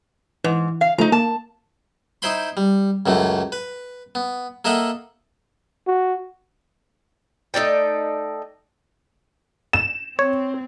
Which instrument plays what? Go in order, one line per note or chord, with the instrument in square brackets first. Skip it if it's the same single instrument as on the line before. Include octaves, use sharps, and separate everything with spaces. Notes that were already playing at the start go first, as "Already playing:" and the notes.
[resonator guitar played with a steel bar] G#2 [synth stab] E3
[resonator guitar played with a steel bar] F5
[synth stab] F3 A3 [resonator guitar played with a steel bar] D#4 A#5
[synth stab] A#3 [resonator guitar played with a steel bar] A5
[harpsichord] D#4 E4 C5 G5 B5 C6
G3
C#2 F#2 E3 A3
B4
B3
A#3 A4 D#5 E5 F#5
[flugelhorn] F#4
[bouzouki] A3 D#4 D5 G5
[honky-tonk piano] E7
[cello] C4 [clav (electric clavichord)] C#5